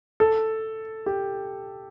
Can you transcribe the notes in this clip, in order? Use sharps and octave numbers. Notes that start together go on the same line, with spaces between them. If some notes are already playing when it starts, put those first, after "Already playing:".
A4
G4